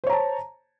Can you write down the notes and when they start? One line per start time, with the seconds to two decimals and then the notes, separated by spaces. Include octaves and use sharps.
0.04 C5
0.07 C#5
0.10 A#5
0.13 A5